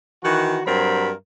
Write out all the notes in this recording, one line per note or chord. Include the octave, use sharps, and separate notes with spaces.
D#3 E3 F#4
G2 F#3 C4 A#4 B5